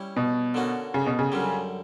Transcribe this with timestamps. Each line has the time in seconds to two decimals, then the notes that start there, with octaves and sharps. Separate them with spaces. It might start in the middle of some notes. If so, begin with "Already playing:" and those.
Already playing: G3 C#4 E4
0.16 B2
0.54 D3 A#3 C#4 F#4
0.94 C#3
1.06 B2
1.19 C#3
1.32 F#2 D3 G3